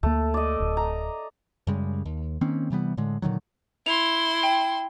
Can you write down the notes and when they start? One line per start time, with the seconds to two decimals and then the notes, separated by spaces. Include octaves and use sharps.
0.03 D2 A3 A#3
0.34 D5 D#5
0.60 D1
0.77 A#5
1.67 F#2 C#3 G3 G#3
2.06 D#2
2.41 D#3 A#3 C4 C#4
2.70 C3 E3 G3 B3
2.97 A2 D3 G#3
3.22 A#2 D3 D#3 F#3
3.86 E4 C6 F7
4.43 G5